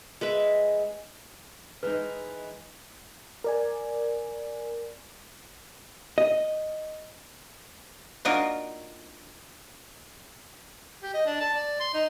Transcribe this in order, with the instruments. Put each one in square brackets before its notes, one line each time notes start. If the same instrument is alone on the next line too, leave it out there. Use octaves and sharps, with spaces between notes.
[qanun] G#3 B4 E5
[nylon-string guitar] E3 G#3 D#4 [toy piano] B4
[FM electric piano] A#4 D5 G#5
[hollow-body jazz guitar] D#5
[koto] A#3 D4 D#4 F4 F#4 A#4
[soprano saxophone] G4
D#5
D4
A5
D5
C6
D#4